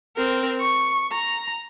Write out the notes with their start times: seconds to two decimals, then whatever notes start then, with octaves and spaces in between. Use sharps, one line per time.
0.17 C4 A#4
0.61 C#6
1.12 A#5